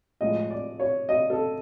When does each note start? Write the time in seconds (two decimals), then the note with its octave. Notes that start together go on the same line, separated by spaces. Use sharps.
0.21 A2 F3 G#3 D#5
0.50 D5
0.80 C#5
1.09 D#5
1.30 A4